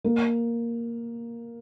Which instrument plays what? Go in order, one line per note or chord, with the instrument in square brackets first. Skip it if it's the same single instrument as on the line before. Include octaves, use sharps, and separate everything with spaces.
[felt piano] A#3